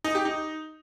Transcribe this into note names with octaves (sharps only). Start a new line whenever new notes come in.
D#4
G4
D#4